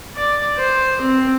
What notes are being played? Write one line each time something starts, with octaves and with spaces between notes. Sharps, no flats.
D5
C5
C4